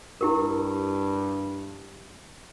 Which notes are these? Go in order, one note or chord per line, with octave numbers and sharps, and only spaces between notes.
G2 E4 G4 A#4